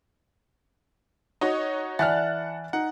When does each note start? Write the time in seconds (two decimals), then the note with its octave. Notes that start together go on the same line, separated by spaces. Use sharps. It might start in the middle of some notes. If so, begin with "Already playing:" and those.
1.41 D#4 F#4 C#5 D#5
1.99 E3 D5 E5 F#5 A5 F6 F#6 A6
2.73 D#4 F#5